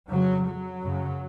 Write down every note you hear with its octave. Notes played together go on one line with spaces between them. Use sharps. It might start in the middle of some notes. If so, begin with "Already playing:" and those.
F2 C#3 F#3
F#3
F#2 C#3